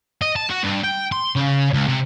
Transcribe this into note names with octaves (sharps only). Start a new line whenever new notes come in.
D#5
A5
F#4
G2
G5
C6
C#3
C#2
C3